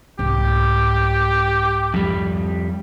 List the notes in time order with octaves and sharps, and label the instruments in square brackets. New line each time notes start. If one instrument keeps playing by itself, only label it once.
[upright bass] C2 G#2 [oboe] G4
[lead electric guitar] F2 G3